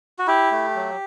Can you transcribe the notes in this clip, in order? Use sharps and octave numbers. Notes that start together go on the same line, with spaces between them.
F#4
E4 G4
A3
F#3